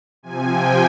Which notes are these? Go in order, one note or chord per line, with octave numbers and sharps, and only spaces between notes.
C3 F3 G#5
G5